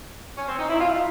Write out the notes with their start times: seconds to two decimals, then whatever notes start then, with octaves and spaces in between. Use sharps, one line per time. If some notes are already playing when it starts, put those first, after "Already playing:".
0.38 C#4
0.48 C4
0.59 D#4
0.70 E4
0.81 F4